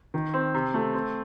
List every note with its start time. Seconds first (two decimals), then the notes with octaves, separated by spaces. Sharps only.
0.14 D#3
0.34 C4
0.54 C3
0.74 A3
0.94 C4